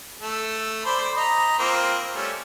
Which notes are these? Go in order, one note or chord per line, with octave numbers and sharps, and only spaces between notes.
A3
C5 D5 B5
D#5 A#5 B5
A#3 C4 F4
G3 A3 C#4